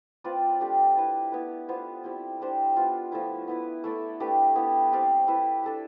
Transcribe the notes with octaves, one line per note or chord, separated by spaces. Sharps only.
C4 F4 B4 D5
A3 D4 G4
E4 B4 F5
B3 E4 B4
B3 F4 C5 F5
G3 C4 E4
G3 D4 G4 C5
G3 B3 F4
F3 A3 E4
B3 E4 B4
A3 E4 A4 D5
A3 D4 G4 B4
B3 E4 G4
C4 G4 D5 F5
E4 B4 E5
D4 A4 E5